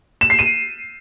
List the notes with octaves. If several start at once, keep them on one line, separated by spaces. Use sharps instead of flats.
E7
C7
D#7